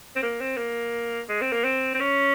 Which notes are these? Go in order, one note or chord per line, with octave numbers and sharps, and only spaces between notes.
C4
A#3
C4
A#3
G#3
C4
A#3
C4
C4
C#4